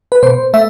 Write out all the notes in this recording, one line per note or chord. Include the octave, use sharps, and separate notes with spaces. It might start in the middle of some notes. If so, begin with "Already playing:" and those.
B4
B2 C5
A3 E5